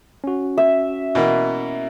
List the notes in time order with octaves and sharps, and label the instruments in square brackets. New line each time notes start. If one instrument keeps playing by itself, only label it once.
[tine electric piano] C#4 F#4
[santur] E5
[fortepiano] B2 E3 A#3